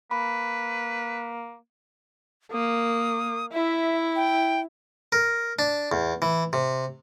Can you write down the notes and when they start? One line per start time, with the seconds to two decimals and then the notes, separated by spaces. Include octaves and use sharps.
0.11 A#3 B4 B5
2.52 A#3 D#6
3.53 E4 E5
4.16 G5
5.12 A#4
5.59 D4
5.92 E2
6.22 E3
6.53 C3